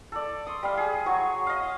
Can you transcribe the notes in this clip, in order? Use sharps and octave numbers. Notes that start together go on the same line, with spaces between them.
A4 D5
C6 D#6
G3 F5
G#4
F#3 C#5 C#6
D#5 F5